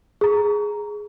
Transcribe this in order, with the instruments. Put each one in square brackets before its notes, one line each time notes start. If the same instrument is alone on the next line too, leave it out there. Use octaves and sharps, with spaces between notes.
[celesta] G#4 A#5